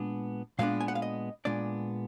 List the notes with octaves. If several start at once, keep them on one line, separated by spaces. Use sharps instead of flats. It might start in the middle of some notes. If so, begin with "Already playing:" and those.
Already playing: A#2 G#3 B3 D4
A#2 G#3 B3 D4 F5
G#5
F#5
F5
D#5
A#2 G#3 B3 D4 D5